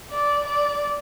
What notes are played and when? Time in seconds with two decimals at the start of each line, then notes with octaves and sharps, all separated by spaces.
0.10 D5
0.45 D5